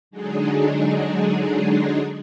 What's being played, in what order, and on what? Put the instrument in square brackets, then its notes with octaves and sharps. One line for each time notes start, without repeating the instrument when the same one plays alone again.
[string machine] D3 F#3 G#3 D4 D#4 G#4